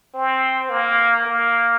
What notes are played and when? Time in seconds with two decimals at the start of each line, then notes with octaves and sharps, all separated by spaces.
0.15 C4
0.70 A#3
1.26 A#3